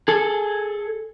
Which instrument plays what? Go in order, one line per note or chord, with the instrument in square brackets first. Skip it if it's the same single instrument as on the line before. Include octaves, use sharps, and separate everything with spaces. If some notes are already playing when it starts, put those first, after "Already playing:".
[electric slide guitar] G#4 A4